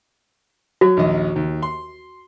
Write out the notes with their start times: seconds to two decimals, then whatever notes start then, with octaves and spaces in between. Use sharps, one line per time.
0.81 F#3 F#4
0.97 A#1 D#2 D#5
1.36 D#2
1.63 C6